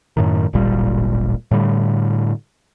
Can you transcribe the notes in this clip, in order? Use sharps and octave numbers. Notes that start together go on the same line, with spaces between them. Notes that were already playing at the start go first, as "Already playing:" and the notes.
F#2 A2 D#3
D1 G#1 A#2 G3
A2 D3 G3